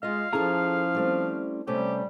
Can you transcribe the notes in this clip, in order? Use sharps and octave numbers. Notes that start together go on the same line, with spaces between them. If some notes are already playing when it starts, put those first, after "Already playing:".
G#3 F4 D#5 F5
F3 C#4 E4 G#4 A4 A5 A#5
G3 A3 C4
C3 G3 A3 C#4 G4